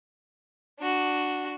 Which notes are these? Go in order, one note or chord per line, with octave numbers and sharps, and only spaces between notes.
D4 F#4